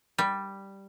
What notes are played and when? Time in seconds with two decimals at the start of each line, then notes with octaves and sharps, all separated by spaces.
0.18 G3